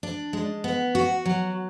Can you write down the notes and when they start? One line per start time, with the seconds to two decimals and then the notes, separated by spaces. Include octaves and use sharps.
0.03 D4
0.33 G#3
0.64 B3
0.95 F#4
1.25 F#3